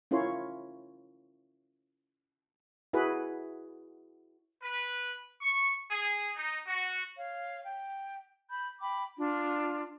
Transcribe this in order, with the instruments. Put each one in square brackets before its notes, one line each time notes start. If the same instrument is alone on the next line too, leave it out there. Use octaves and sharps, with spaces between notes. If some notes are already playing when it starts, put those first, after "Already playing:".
[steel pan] C#4 E4 F4 A#4 C#5 C6
E4 F#4 G#4 B4
[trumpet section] B4
C#6
G#4
D#4
F#4
[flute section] C#5 F5
G5
B5 G6
G5 B5 D6
D4 F4